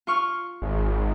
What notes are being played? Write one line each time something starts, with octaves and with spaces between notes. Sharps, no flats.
F4 C#6 F6
G#1